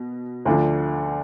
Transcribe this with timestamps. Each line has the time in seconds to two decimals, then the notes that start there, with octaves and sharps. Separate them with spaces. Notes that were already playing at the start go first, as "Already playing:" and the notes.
Already playing: B2
0.45 D2 D3 F3